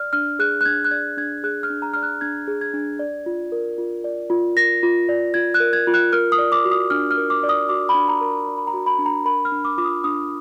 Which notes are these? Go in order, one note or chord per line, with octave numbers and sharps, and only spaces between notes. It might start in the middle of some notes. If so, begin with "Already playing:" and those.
Already playing: D5 F6
D4 F6
G#4 F#6
F#6
D4 G#6
F#6
D5 G#6
D4 G#6
G#4 F#6
F6
D4
A#5
D5 F6
F#6
D4 G#6
G#4
G#6
D4
D5
F4
A#4
F4
D5
F4
A#4 A#6
F4
D5
F4 G#6
F#6
A#4
G#6
F4
F#6
A#4 F6
D#6
D5
D6
F#4
D#6
D4 F6
F6
A#4
D6
D5
D#6
F#4 D6
B5
D4
A#5
A#4
D5
B5
A#5
F#4
B5
D4
A#5
A#4 B5
F6
D4
D6
F4 D6
D#6
D4 D#6